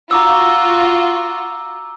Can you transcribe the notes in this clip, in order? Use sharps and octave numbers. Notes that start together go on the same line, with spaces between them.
F4 F#4 A#5 D6 E6